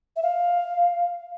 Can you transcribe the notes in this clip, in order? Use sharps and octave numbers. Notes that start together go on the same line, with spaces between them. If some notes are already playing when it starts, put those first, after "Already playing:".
E5
F5